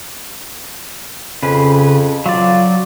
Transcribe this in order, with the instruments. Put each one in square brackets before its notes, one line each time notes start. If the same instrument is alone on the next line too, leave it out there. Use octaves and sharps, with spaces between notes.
[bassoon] F2 [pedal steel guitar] C#3 B4
[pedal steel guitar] F#3 D5 [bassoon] F4